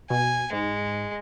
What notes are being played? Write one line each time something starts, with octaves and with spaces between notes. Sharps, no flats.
B2 G#5
G#2 G#3